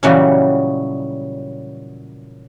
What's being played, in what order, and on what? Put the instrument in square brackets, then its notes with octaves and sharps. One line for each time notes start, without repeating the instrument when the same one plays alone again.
[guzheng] A#2 C#3 E3 F#3 G3 F#4